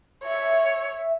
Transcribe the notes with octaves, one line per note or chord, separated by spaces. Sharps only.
C#5 E5